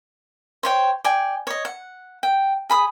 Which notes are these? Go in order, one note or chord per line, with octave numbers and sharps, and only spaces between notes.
C5 C#5 G5
D5 G5 G#5
C#5 D#5
F#5
G5
G#4 B5 D#6